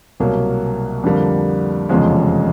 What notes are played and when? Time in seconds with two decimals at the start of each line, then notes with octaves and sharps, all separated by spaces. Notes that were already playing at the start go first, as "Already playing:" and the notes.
0.20 C2 B2 F#3 A#3
1.04 F2 D3 G3 A#3
1.89 F1 E2 C#3 F3 G#3